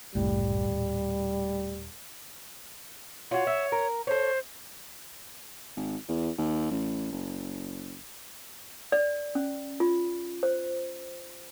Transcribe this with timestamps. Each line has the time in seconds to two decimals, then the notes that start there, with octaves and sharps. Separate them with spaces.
0.15 F#1 C2 A2 G3
0.69 D#1
3.31 F4 F#4 C#5
3.47 E5
3.72 A#4
4.07 A4 C5 C#5
5.77 G#1
6.08 E2
6.38 D#2
6.71 A1
7.12 F#1
8.92 D5
9.35 C#4
9.80 F4
10.43 C5